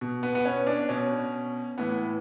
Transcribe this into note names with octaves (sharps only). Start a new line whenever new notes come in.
B2
B3
B3
C#4
D4
B2 C#4
A2 E3 B3